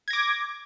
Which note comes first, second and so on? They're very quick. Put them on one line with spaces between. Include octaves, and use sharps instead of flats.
G#6 A#6 D6